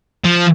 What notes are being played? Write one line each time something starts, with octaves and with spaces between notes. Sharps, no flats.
F3